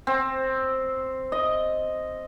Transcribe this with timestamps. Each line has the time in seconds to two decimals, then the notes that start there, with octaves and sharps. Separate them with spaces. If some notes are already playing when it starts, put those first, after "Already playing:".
0.07 C4
1.32 D#5